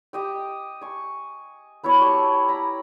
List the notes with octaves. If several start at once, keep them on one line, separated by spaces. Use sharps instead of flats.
G4 D#5 G5
G#5 C#6
B3 E4 F#4 C#5
G4 A5 C#6
A#5 B5